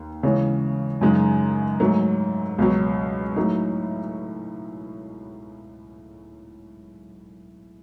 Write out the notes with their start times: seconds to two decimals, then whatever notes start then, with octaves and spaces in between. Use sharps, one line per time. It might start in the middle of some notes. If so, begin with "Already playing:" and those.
Already playing: D#2
0.23 C#3 E3 G#3 C#4
1.01 F#2 C#3 G#3 D#4
1.80 G#2 F#3 A3
2.58 C#2 B2 F#3
3.36 A2 F#3 A3 D#4